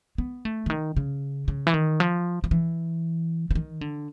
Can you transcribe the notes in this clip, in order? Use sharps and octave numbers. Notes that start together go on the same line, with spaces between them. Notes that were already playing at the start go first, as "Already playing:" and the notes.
B3
A3
D3
D#3
C#3
C#3
E3
D#3
F3
F3
E3
E3
D#3
D3